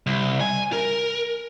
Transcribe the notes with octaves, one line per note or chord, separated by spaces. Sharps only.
C2
G#5
A#4